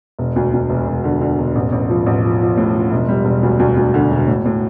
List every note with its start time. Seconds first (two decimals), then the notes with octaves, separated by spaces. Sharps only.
0.19 E1
0.36 D2
0.53 D2
0.70 E1
0.87 E1
1.04 D3
1.21 D3
1.38 E1
1.55 A1
1.72 A1
1.89 F3
2.06 A1
2.24 F3
2.41 F3
2.57 A2
2.74 F3
2.91 E1
3.09 G3
3.25 E1
3.43 D2
3.59 D2
3.77 D2
3.94 D3
4.11 E1
4.27 A2
4.45 A2